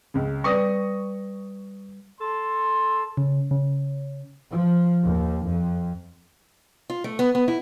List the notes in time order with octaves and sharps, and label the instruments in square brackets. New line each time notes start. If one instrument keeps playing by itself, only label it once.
[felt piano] C#2 C#3
[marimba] G3 B4 D5 [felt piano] C#6 D#6 A#6
[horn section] A4 C6
[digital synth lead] C#3
C#3
[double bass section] F3
D#2
F2
[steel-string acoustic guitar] F4
A3
B3
B3
E4